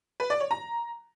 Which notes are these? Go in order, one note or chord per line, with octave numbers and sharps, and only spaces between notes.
B4
D5
C#5
A#5